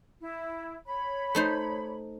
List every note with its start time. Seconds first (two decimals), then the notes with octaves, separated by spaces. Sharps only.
0.21 E4
0.86 C#5 B5
1.35 A3 D#4 C5